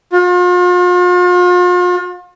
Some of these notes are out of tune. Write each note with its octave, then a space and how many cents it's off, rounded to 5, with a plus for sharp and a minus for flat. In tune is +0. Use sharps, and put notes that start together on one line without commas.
F4 +40